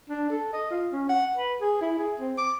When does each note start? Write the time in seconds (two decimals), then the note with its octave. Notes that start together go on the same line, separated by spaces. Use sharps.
0.09 D4
0.30 A4
0.53 D#5
0.71 F4
0.92 C#4
1.09 F#5
1.37 B4
1.61 G#4
1.82 E4
1.98 G#4
2.20 C4
2.38 D6